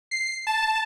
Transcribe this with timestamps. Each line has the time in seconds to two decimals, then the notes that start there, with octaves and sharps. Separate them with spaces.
0.11 C7
0.47 A5